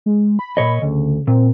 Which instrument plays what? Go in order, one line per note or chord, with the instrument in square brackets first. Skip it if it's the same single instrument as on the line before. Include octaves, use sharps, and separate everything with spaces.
[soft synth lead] G#3
B5
[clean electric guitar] A#2 C#5 D#5
[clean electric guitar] D2 [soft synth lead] C#3
[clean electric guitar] A#2 [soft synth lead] C4